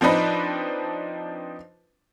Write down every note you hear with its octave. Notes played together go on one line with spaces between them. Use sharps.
F3 C4 D4 D#4 B4